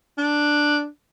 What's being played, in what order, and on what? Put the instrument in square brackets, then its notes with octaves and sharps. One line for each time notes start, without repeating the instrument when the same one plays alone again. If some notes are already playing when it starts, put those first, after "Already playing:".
[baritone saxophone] D4